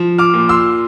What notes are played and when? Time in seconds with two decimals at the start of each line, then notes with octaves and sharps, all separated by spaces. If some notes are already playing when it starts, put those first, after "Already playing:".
Already playing: F3
0.18 D6 F6
0.34 A#2
0.49 C6 E6